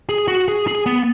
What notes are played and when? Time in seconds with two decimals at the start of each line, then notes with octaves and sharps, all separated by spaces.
0.09 G#4
0.28 F#4
0.48 G#4
0.68 G#4
0.86 B3